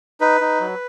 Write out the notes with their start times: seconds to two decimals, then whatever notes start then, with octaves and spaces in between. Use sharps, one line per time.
0.21 D#4 B4
0.41 D#4
0.60 F#3